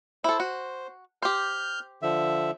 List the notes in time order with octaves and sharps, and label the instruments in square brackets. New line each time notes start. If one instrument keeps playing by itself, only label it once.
[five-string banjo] E4 A4 [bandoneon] C5
[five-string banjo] F#4
[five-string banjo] G4 C5 [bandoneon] F6 G6
[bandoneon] D3 F3 E5